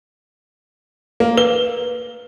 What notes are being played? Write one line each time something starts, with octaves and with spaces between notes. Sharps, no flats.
A#3
B4 G7